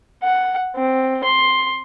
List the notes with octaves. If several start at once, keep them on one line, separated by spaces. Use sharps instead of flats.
F#5
C4
C6